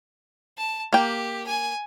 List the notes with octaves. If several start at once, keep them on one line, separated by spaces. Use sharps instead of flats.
A5
A#3 G4 G5
G#5